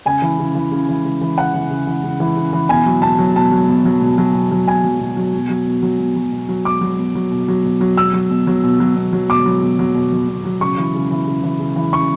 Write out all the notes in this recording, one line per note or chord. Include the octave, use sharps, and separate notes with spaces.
C#3 G#5
E3
C#3
E3
C#3
E3
C#3
E3
C#3 F#5
E3
C#3
E3
C#3
E3
C#3
E3
B2 G#5
F#3
B2 A5
F#3
B2 A5
F#3
B2
F#3
B2
F#3
B2
F#3
B2 G#5
F#3
B2
F#3
B2
F#3
B2
F#3
B2
F#3
B2
F#3
B2 D6
F#3
B2
F#3
B2
F#3
B2
F#3
B2 E6
F#3
B2
F#3
B2
F#3
B2
F#3
B2 D6
F#3
B2
F#3
B2
F#3
B2
F#3
C#3 C#6
E3
C#3
E3
C#3
E3
C#3
E3
C#3 C#6